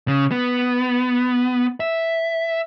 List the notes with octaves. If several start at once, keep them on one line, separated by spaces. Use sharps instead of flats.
C#3
B3
E5